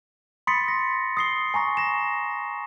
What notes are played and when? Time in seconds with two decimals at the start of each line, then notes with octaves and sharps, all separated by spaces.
0.47 B5 C6 D#6 A6 B6 C#7
0.68 A#6
1.17 D#6 C7 G7
1.54 G#5 A#5 C#6 A#6
1.77 A#6 E7